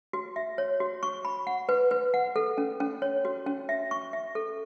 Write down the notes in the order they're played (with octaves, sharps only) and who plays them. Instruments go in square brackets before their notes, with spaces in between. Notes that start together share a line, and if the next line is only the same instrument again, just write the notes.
[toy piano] F#4
E5
C#5
F#4
C#6
B5
F#5
B4
B4
F#5
A4
C#4
C#4
C#5
F#4
C#4
E5
C#6
E5
A4